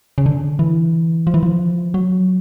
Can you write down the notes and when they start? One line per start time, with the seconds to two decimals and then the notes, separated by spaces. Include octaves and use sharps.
0.18 C#3
0.26 D3
0.59 E3
1.27 F3
1.34 E3
1.43 F3
1.94 F#3